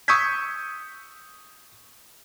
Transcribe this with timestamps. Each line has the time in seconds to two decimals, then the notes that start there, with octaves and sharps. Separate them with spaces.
0.08 C#6 D#6 E6 G6 G#6 B6